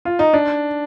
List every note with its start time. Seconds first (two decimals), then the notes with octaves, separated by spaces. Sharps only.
0.05 F4
0.19 D#4
0.33 D4